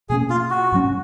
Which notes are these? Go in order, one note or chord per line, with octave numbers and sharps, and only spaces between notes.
B2 A#3 C#4 G#4
F4
F#4
G#2 F#3 C#4